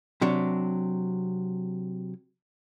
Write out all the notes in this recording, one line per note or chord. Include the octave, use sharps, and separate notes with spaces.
C3 F#3 D4